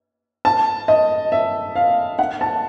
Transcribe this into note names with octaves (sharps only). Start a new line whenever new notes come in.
A5
D#5
E5
F5
F#5
A5